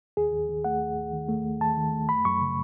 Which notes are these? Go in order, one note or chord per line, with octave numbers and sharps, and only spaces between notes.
D#2 G#4
D#2
D#3
A3 F#5
D#2
D#2
D#3
A3
D#2
D#2 A5
D#3
A3
F#2 B5
F#2 C#6
C#3